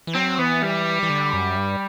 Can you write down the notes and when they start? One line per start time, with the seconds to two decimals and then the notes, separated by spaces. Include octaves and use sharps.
0.07 E3
0.15 F#3 C4
0.38 E3 B3
0.62 G3
1.03 E3
1.10 D3
1.33 F#2
1.57 G2